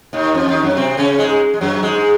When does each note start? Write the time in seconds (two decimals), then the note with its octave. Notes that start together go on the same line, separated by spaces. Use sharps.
0.13 D#2 D#3
0.34 F2 F3
0.48 D#2 D#3
0.62 F#2 F#3
0.77 C3 C4
0.97 C#3 C#4
1.18 G#2 G#3
1.54 G#3
1.61 F#2 F#3
1.83 G#2 G#3